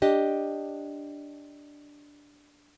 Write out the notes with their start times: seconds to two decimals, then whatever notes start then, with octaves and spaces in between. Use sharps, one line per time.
0.02 D4 G4 D#5